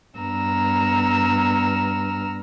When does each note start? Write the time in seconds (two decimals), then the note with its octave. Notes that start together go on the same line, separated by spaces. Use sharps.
0.17 G2 B3 A#5 E6 F6